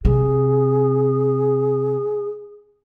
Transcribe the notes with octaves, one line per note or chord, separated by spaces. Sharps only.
C3 G#4